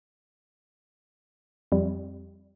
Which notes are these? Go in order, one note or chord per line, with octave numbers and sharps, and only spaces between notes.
F2 G3